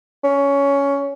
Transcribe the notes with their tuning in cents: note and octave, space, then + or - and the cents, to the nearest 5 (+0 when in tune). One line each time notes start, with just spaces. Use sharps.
C#4 +15